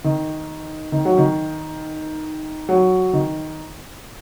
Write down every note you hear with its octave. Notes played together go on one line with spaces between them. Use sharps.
D#3
D#3
F#3
D#3
F#3
D#3